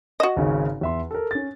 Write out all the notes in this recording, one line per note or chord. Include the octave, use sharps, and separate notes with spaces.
F#4 D#5
G#1 C#3 C#4
E2 E5 C6
A4 A#4
C#4 A6